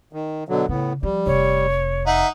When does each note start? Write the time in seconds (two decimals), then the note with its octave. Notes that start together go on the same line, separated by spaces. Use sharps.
0.13 D#3
0.49 B2 D3 F#3
0.69 A2 C#3 B3
1.03 F3 G3
1.26 F1 C#5
2.07 D#4 E5 F#5